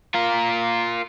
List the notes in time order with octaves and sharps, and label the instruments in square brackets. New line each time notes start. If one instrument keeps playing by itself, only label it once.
[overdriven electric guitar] F4 A#4